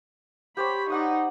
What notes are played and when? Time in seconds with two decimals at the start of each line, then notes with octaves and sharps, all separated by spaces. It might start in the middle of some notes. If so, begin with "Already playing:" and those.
0.57 G4 C5 C#5 B5
0.90 D#4 D5 F#5 D#6